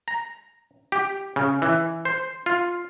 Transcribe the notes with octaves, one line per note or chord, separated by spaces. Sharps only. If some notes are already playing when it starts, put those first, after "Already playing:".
A#5
G4
C#3
E3
C5
F4